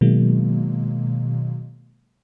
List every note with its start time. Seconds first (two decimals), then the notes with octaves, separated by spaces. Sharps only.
0.01 B2 D#3 F#3 G#3 A#3